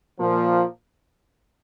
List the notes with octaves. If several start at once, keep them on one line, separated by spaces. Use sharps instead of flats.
A#2 F3 A#3